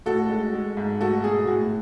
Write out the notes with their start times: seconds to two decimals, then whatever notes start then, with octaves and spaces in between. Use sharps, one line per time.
0.06 A2 F#4 A4
0.29 G#3
0.54 G#3
0.77 G#2
1.00 A3 F#4 A4
1.24 B2 G#4
1.47 A2 F#4